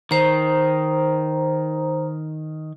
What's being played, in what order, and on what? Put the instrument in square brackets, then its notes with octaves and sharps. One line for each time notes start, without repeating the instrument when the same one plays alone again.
[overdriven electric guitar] D#3 [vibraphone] C5 A#5